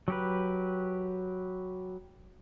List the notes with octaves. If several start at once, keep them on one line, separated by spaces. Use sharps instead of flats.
F#3 G4 B4